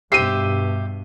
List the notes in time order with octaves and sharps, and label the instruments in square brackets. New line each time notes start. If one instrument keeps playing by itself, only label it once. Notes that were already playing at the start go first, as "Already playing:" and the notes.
[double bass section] G2 B2 [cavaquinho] G4 C5 E5 [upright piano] C7 D#7